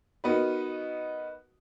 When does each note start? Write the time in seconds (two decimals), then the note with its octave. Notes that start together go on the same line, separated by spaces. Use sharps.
0.24 B3 D#4 F#4 A#4 B4